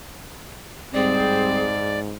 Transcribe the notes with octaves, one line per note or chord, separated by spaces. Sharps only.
G#2 G3 C4 G#4 D5